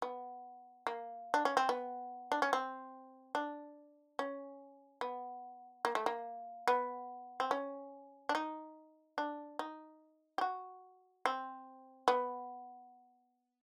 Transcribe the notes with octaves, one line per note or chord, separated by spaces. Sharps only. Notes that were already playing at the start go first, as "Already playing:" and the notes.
B3
A#3
D4
C#4
C4
B3
D4
C#4
C4
D4
C#4
B3
A#3
A3
A#3
B3
C4
C#4
D4
D#4
D4
D#4
G4
F#4
C4
B3